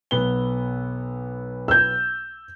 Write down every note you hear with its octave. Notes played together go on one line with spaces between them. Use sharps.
B1 B3 G7
E6 G6